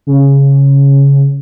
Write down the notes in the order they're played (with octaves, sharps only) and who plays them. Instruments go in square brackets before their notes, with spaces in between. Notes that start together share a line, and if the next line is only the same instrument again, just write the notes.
[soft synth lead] C#3